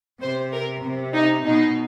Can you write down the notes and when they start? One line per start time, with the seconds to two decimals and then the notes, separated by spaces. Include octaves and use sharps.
0.21 C3 C5
0.53 A#4
0.84 C3
1.14 D#4
1.45 B2 D#4